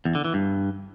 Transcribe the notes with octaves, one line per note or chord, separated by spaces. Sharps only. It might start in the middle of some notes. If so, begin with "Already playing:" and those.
E2
D3
E3
G2